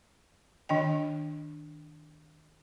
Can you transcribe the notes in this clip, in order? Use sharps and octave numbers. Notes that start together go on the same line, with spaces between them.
D#3 D4 D#5 G5